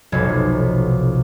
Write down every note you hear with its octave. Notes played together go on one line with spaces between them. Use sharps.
F1 B1 C#5